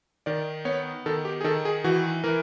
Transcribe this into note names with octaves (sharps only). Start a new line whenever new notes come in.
D#3 D5
B3 C#5
D#3 A4
G4
G#4
D#3 A4
G#4
E3 F#4
E3 A#4